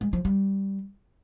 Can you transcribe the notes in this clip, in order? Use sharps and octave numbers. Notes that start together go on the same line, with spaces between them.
G#3
F3
G3